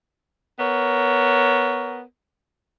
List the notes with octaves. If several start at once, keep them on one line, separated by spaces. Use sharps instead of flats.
B3 A#4 C#5